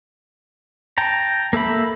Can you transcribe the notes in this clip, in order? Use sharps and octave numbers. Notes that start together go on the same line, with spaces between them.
G5 A5 A#5
A#3 A4 E5 B5